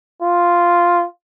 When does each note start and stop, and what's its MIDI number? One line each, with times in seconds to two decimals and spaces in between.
0.22 1.05 65